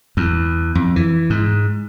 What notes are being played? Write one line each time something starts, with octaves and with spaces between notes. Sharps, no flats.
E2
F2
E3
G#2